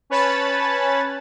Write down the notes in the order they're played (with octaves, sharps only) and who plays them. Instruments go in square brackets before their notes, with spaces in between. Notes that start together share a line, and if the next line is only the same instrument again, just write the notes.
[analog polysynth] C#4 B4 C#5 A5 B5 A6